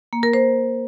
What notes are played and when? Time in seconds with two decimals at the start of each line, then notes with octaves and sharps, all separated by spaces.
0.13 A#3
0.23 A#4
0.34 C5